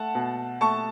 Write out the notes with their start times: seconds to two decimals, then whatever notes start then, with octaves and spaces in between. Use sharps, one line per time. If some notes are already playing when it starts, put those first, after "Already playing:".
Already playing: A3 F#5 A5
0.15 B2
0.61 A3 A5 C#6